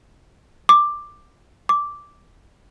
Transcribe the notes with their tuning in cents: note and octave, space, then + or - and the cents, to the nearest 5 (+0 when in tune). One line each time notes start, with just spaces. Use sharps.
D6 +10
D6 -5